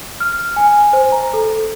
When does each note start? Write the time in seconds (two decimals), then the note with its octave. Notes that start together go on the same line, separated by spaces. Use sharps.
0.20 F6
0.56 G#5
0.93 C5
1.12 A#5
1.34 A4